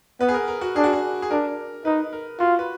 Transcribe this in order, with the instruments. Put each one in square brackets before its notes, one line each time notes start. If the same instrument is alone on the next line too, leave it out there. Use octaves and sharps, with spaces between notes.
[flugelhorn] B3 [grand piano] B4
[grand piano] G#4
A#4
A#4
F#4
[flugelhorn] D4 [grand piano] G#4
[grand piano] F#4
G#4
G#4
[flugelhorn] D4 [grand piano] A#4
[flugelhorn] D#4 [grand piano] B4
[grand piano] A#4
[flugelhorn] F4 [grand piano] F#4
[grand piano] B4